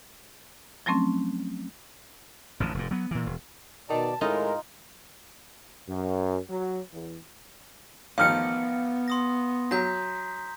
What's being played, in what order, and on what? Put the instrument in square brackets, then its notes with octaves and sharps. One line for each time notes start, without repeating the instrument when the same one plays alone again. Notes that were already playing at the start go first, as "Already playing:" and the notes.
[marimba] F3 F#3 A3 C4 C#4
[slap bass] A1 F2 D3
F1 G#2
F#3 B3
A#2 E3
E1
[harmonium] B2 D5 [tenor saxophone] D#3 [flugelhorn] A5
[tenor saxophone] A2 [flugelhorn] G#3 [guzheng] D#4 F4 [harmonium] A#4
[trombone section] F#2
F#3
E2
[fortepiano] A1 D#3 F3 [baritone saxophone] B3 [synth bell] F5 F6 C#7
[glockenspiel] C6 D#6 A#6
[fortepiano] F#3 [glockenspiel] A#5 G6 B6